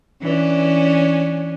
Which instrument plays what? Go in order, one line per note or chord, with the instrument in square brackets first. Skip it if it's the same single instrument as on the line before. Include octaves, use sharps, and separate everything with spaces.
[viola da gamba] E3 C#4 D4